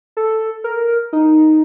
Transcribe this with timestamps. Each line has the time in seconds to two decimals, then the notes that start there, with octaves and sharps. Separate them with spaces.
0.17 A4
0.64 A#4
1.13 D#4